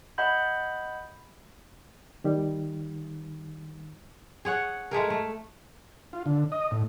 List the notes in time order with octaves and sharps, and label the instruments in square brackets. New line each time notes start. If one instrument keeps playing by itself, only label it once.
[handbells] D#5 F#5 B5 G6
[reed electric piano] D#3 G3
[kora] G#4 C#5 F#5
G#3 A3 G#4 A#4
A3
[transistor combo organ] F4
D3
D#5
A2